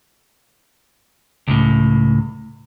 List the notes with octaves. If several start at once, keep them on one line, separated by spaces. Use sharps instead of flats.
C#2 A2